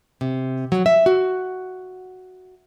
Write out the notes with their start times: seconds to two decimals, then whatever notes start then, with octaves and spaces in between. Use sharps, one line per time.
0.21 C3
0.72 F#3
0.86 E5
1.06 F#4